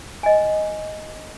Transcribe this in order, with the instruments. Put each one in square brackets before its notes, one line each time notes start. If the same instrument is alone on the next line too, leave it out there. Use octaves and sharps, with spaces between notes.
[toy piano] D#5 G#5